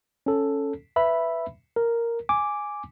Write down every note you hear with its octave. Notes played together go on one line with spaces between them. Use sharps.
C#4 A4
B4 E5 B5
A#4
G#5 D6